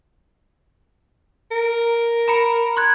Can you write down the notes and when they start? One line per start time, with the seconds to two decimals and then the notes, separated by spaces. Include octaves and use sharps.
1.52 A#4
2.28 A#5 B5 C#7
2.77 C6 F#6 G#6